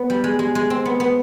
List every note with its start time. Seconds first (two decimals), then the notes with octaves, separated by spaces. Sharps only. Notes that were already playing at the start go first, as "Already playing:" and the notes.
Already playing: B3
0.10 G3
0.24 G#3
0.39 G#3
0.55 G#3
0.70 C4
0.85 B3
1.00 B3